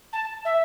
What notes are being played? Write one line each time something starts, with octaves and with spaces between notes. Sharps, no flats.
A5
E5